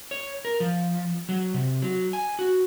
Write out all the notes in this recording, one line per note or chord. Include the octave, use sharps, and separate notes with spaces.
C#5
A#4
F3
F#3
C3
F#3
G#5
F#4